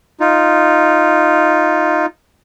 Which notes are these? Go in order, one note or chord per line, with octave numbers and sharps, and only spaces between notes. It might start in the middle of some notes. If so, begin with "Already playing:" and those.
D#4 F4